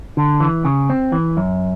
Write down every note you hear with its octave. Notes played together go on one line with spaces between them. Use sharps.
D3
E3
C#3
C4
E3
F#2